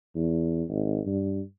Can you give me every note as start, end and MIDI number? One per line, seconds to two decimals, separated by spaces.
0.16 0.63 40
0.69 1.00 32
1.06 1.41 43